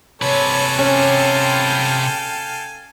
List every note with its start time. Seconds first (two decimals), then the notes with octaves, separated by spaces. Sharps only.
0.22 C3 A4 B4 C#5 G#5
0.79 C#4 F5 G5